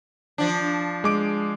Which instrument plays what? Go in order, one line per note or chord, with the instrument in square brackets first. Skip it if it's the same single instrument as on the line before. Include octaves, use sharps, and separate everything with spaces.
[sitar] F3 D4
[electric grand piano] G#3 D6 D7